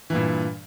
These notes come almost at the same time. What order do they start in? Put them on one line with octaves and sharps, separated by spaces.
E3 G2 A#2